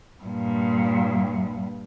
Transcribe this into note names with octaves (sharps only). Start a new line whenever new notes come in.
G2 A#2